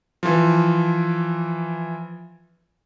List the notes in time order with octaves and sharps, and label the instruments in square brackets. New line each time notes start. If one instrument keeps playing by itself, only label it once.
[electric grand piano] E3 F3